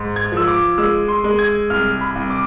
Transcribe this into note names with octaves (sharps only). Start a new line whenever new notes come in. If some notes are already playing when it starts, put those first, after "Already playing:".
Already playing: G#2
G#6
F3 E6
D6
G#3 E6
C6
G#3
G#6
C2 F6
B5
C2
D6